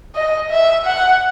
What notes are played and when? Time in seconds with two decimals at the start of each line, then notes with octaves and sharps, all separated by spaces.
0.15 D#5
0.51 E5
0.86 F#5